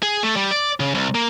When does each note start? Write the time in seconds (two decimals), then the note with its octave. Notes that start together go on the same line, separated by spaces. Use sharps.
0.03 G#4
0.23 A3
0.36 G3
0.51 D5
0.80 C#3
0.95 C2
1.15 A#3